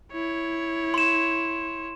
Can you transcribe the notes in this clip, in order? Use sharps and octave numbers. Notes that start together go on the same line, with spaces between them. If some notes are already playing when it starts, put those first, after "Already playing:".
E4 C#5
C6 E7